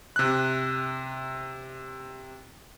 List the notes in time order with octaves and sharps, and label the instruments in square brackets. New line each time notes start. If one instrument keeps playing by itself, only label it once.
[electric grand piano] C3 F#6